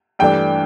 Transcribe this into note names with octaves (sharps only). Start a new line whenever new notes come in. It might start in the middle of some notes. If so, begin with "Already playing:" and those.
G2 E3 A3 D4 G5